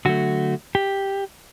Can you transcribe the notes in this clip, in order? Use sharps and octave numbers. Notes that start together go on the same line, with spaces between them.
D3 F#3 A3 F#4
G4